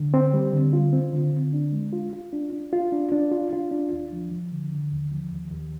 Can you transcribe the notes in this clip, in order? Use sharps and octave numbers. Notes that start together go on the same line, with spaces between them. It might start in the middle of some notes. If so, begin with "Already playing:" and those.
Already playing: D3
C4
G3
D3
F4
C4
D3
D3
D4
G#3
F4
F4
D4
D4
F4
D4
D4
F4
F4
D4
D#2
F3
F3
D3
D3
D#2
F3
D#2
D#2